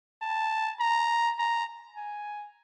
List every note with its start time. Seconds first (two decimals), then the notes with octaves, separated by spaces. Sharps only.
0.22 A5
0.80 A#5
1.39 A#5
1.97 G#5